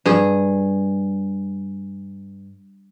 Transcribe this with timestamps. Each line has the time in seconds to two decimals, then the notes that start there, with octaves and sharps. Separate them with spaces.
0.06 G2 G#4